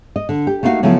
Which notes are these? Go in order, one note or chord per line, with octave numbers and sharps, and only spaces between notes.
D#5
D3
G4
A3 A#3 D#4 E4 F#4 F5
C#3 F3 F#3 A3 B3 E4